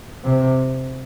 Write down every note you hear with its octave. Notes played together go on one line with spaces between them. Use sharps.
C3